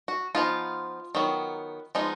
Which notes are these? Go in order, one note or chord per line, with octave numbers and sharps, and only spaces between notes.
F#4
F3 B3 D#4 F4
D#3 F#3 B3
F3 G#3 B3 D#4